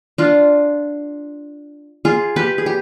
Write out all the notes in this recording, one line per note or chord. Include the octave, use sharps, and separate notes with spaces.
D4 F4
F4 G#4
G4 B4
G#4
G4